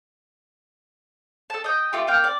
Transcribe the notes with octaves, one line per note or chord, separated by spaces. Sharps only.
A4 A5
D#5 G5
A3 F4 G4
A#3 F5 G5
D5